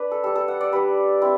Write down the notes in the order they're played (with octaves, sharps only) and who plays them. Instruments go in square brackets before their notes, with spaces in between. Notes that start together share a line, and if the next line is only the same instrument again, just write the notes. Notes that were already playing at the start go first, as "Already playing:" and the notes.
Already playing: [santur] D4 B4
A4
G3 D4 A4
A4
F#5
D5
G3 D4 B4
C4 E4